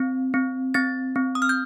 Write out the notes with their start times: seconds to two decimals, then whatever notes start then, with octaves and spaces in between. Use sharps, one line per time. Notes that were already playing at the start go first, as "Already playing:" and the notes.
Already playing: C4
0.34 C4
0.74 C4 A6
1.16 C4
1.35 D#6
1.42 F6
1.49 G6